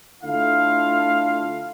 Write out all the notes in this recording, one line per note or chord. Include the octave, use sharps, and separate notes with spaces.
D3 A3 E4 F4 F5